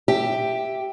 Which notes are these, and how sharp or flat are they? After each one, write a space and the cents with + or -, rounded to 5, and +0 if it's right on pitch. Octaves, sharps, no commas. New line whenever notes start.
G4 +0 E5 +0